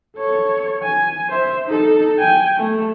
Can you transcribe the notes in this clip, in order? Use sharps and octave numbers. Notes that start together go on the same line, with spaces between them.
A4 C#5
G#5
C5 E5
D#4 A4
G5 G#5
A3